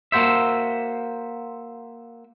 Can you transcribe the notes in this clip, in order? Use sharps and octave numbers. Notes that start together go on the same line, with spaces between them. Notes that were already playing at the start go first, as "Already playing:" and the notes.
A#3 F#4 C5 E5